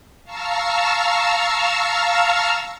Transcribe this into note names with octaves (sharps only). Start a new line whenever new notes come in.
F5 A5 A#5 C#6 E6 F6